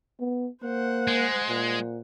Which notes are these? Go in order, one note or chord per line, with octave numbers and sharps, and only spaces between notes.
B3
A#3 C5 F#5
G#3
A#2